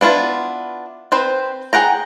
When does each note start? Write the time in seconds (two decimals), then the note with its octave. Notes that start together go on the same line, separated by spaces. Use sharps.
0.01 B3 D4 E4 F4
1.12 C4 B4 C5
1.73 G#4 F#5 G5 A#5